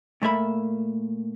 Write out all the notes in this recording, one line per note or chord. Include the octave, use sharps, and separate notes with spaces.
A#2 A3 A#3 E5 B5